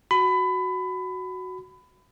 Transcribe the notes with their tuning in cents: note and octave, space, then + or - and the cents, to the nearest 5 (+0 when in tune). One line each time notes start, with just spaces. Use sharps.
F#4 +0 B5 +25